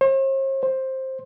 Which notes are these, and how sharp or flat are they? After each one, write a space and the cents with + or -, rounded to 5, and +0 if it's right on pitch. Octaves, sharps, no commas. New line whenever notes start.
C5 +45
C5 +10